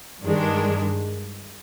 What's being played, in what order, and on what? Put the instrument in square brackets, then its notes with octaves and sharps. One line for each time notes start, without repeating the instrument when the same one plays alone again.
[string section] G2 D#3 G#3 D4